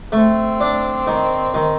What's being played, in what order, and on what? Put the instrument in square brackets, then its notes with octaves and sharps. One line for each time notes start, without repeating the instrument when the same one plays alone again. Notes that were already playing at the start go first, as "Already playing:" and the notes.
[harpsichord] A3 [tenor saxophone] C4
[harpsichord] D4
D#3
D#3